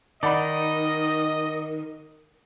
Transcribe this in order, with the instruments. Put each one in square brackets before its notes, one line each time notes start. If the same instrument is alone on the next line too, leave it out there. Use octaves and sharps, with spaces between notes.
[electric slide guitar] D#3 [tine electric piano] D#4 [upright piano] D5 F#5 B5 [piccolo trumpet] D#5